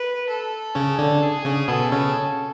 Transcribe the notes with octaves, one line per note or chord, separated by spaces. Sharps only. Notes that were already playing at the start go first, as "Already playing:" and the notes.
Already playing: B4
A4
C#3 C#4
D3 D4
G#4
C#3 C#4
B2 B3 A4
C#3 C#4